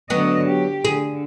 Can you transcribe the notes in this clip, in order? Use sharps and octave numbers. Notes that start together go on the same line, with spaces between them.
D3 F#3 B3 D#5
G4
D3 G#4